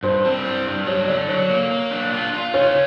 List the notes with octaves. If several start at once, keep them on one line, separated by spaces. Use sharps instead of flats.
G2 C5
C4
G3
G2
F#3 C#5
D3 D5
F#3 C#5
A#3
A#3
D4
F4
F4
C#4 C#5